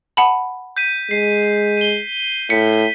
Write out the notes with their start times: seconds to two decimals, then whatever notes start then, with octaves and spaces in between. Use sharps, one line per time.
0.17 F#5 A5 B5
0.77 G6 B6 D#7
1.11 G#3 C7
1.77 D#7 G7
2.50 A2 B6 C#7